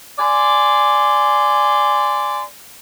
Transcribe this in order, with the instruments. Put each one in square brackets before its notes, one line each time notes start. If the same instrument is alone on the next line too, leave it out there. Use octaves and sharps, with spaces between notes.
[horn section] D5 G#5 C6